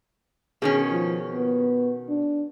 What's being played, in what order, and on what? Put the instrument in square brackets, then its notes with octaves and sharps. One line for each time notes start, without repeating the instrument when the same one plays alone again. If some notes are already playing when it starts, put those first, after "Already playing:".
[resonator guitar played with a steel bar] B2 D#3 C#4 [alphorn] G#4
[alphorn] F3
B3
D4